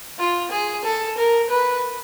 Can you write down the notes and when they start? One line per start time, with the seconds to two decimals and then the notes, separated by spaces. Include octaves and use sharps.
0.19 F4
0.51 G#4
0.85 A4
1.17 A#4
1.50 B4